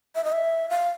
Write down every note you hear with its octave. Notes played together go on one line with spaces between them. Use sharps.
E5
D#5
E5
F5